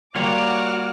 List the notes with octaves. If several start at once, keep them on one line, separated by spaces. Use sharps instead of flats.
G3 A#3 F4 F#4 C#5 F#5 D6 F6